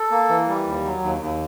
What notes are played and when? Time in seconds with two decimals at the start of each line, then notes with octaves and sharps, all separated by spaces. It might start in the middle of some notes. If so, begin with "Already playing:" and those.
Already playing: A4
0.11 A#3
0.29 E3
0.48 G3
0.67 D#2
0.85 F#3
1.03 D#2
1.22 D#2